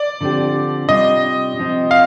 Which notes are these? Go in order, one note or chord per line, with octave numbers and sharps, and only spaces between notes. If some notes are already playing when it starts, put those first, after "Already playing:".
Already playing: D5
D3 F3 C4 G4
C3 G3 D4 F4 D#5
C3 F3 C4
F5